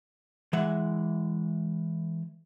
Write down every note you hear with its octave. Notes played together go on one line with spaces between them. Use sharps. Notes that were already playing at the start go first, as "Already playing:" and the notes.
E3 G#3 E5 F#5